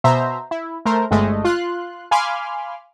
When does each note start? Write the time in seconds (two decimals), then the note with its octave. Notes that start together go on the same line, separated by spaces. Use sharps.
0.04 B2 C5 E5 A#5
0.51 E4
0.85 A3 A#4 C5
1.11 G1 G#3 A3 D#5
1.45 F4 C6 F#6
2.11 F5 G#5 B5 C6 D6 F6